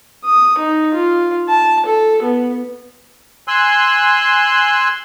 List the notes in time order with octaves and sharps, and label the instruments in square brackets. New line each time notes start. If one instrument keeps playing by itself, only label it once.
[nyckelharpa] D#6
D#4
F4
A5
A4
B3
[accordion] G#5 C6 E6 F#6